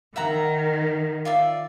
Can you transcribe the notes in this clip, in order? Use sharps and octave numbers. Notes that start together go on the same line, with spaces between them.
D#3 E5 F#5 A#5
F4 D5 E5